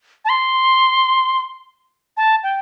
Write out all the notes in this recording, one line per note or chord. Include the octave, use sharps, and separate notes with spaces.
A5
C6
A5
G5